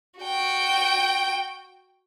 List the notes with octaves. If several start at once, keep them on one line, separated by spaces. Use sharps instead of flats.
F#4 G5